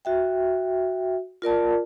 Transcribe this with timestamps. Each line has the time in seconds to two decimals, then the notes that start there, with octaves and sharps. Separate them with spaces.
0.05 F#4 E5 G5
1.42 F4 A#4 D5 A5